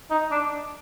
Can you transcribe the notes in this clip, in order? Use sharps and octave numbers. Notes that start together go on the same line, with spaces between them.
D#4
D4